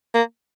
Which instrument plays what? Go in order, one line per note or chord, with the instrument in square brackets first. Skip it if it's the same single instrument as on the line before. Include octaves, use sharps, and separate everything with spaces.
[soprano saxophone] A#3